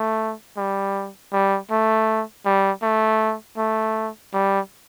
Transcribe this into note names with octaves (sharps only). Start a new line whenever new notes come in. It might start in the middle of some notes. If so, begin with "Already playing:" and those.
Already playing: A3
G3
G3
A3
G3
A3
A3
G3